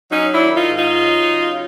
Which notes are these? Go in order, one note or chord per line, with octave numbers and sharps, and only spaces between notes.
F#3 C#4 D#4
D4 E4
D#3
D#4 F4
G#2
D#4 F4
F#3
C#3